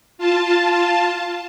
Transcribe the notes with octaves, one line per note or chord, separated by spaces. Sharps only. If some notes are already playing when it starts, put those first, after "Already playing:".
F4 A5